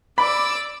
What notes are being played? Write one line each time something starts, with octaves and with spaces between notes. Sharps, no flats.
D5 B5 D6 E6